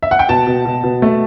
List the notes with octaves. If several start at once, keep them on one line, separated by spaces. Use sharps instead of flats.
E5
F#5
G5
B2 A5
B2
B2
B2
A3